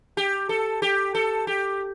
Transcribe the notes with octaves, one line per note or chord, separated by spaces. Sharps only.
G4
A4
G4
A4
G4